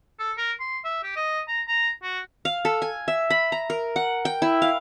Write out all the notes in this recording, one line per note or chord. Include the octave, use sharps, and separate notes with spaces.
A4
A#4
C6
E5
G4
D#5
A#5
A#5
F#4
F5
A4
G#5
E5
B5
A#5
A#4
F#5
G5
E4
F5